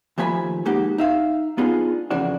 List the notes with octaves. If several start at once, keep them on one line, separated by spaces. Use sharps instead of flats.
D#2 F3 A3 G#5 B5
G#3 A#3 D#4 F#4 G4
D#4 E5 F5
B3 D4 D#4 F4 G#4
F2 C#3 E3 D4 F#4